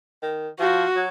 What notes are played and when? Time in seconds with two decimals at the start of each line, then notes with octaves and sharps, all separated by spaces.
0.22 D#3
0.59 F3 F#4
0.96 F#3